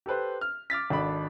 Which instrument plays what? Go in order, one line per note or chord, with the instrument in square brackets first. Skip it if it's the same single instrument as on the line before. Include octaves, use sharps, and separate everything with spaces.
[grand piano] G4 A4 B4 C5
F6
D6 F6 A6 B6
G#1 D4 A4 D#5 B5